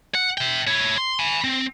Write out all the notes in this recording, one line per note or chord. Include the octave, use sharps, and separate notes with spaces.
F#5
E5 G5
E4 C#5
C6
G#5 B5
C4